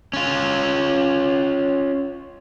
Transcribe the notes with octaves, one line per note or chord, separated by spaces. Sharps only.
C#4 F4